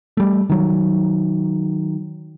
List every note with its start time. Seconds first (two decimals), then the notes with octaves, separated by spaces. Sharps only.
0.17 G3 A3
0.50 D#3 F#3